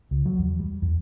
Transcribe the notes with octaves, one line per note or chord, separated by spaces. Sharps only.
C#2
F#3
E2
G3
E2